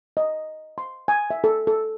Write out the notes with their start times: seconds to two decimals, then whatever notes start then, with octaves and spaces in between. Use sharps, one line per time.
0.17 D#5
0.78 C6
1.08 G#5
1.30 E5
1.44 A4
1.67 A4